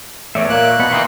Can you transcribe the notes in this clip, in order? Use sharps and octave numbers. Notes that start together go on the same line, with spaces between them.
E2 A2 C#5 D5 E5
A#2 A#3 F#6
B2 B3
D#3 E3 D#4 D5 C6